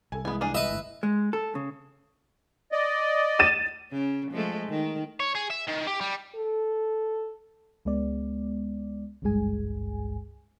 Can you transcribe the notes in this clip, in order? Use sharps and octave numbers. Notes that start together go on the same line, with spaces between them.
C2 A4 G#5
E3 G#3 B3 G#5
A#3 D4 G#4
B4 D#5 E5
G1 A2
G#3
A4
C#3
D5 D#5
A6 D#7 E7
C#3 C#4
F3 G#3 A3
D#3
C#5
G#4
E5
D#3
G4
G3
A4
C#2 G#3 B3 D5
G#1 C#2 G2 G#3 G#4 G#5